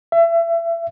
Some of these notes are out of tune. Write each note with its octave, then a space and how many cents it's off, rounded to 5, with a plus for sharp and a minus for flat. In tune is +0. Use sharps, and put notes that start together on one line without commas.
E5 +30